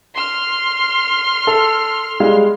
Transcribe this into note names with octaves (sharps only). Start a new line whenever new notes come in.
C6 F6
A4
G3 G#3 F5